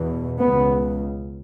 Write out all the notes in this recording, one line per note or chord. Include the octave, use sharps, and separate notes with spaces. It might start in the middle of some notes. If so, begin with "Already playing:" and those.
Already playing: E2 B2
C#2 C#3 B3